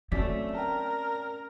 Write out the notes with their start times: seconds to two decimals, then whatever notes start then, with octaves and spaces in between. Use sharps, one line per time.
0.12 F#3 A3 C4 C#4 D5 B6
0.55 A#4 G5 A5